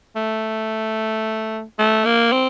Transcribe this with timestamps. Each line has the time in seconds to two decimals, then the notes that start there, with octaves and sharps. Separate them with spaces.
0.16 A3
1.79 A3
2.05 A#3
2.32 C4